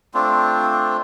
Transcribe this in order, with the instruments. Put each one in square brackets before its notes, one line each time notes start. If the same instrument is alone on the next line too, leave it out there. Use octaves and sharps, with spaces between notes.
[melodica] A3 C4 D4 F4